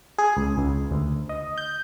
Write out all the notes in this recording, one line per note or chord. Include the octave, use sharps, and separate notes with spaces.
G#4
C#2
C#2
D2
D#5
G6